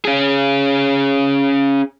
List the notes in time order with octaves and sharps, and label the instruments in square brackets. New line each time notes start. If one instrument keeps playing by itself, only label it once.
[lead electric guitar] C#4 G#4